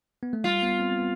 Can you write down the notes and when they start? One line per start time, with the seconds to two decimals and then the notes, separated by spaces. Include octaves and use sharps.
0.23 B3
0.33 A3
0.44 G3 F4
0.62 B3
0.80 C4
0.98 B3